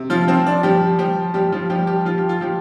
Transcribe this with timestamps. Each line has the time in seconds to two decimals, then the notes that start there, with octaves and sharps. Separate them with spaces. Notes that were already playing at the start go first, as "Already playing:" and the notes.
Already playing: C3
0.10 F3 F4
0.28 F3 C4
0.46 D4
0.63 F3 G3 G4
0.99 F3 G3 G4
1.34 F3 G3 G4
1.52 F3 F4
1.70 F3 G3 G4
1.87 G3 G4
2.05 F3 F4
2.18 G4
2.29 F4
2.41 F3 G4